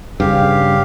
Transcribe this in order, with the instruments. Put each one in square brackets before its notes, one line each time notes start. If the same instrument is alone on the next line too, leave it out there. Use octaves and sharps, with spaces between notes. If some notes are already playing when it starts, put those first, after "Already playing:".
[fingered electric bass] G2 C#3 [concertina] G4 F5